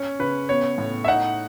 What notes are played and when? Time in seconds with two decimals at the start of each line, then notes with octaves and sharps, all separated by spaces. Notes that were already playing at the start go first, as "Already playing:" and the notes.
Already playing: C#4 C#5
0.19 C#3 B4
0.49 B3 C#5
0.78 A2
1.04 E5
1.08 D#4 F#5